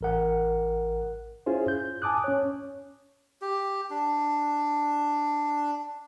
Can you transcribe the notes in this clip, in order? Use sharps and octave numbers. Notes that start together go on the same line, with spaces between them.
A1 A#4 F#5
C#4 E4 F4 G#4 C5
G6
G#5 A5 D6 D#6 F#6
C#4 C#5
G4
D4